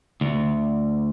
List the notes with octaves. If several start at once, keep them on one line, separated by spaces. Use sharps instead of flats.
D2